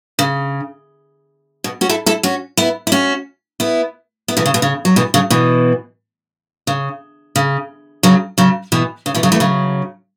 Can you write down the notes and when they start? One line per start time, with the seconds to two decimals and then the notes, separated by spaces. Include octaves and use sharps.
0.19 C#3
1.64 B2
1.81 C#4 F#4
1.89 E4 A4
2.06 E4 A4
2.23 C#4 F#4
2.57 B3 E4
2.87 E4
2.92 C#4 F#4
3.60 B3 E4
4.28 B3 E4
4.37 B2 E3
4.46 C#3
4.54 B2
4.62 C#3
4.85 F#3
4.96 B2 E3
5.14 C#3 F#3
5.30 B2 E3
6.67 C#3
7.36 C#3
8.03 C#3 F#3
8.38 C#3 F#3
8.72 B2 E3
9.06 C#3
9.14 B2 E3
9.23 C#3 F#3
9.32 E3 A3
9.40 C#3 F#3